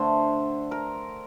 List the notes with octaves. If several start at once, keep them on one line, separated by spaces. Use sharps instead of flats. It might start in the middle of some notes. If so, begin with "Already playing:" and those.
Already playing: D3 A3 C5
A#4